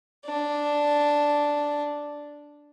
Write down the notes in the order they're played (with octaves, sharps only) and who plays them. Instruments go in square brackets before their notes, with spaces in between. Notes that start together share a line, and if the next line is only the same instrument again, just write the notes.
[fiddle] D4